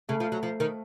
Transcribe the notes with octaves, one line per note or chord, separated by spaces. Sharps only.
C#3 A3
F3
F#3
F3
D#3